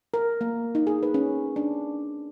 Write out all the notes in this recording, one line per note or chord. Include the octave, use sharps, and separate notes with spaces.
A#4
A#3
D#4
G#4
B4
C#4
D4